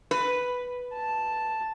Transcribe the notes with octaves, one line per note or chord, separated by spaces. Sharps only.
B4
A5